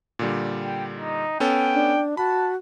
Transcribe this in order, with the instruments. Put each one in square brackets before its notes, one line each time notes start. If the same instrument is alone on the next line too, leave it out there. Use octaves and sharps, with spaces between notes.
[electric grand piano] A#2 D3 G3
[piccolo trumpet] G5
D#4
[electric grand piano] B3 C#4 A4 [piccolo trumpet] G5
[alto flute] D4
[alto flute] F#4 [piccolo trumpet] A5 [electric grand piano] B5